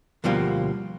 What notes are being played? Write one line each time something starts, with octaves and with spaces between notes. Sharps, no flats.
D2 B2 F3 G3 A#3